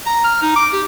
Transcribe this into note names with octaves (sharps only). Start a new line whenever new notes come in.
A#5
F6
D#4
D6
G4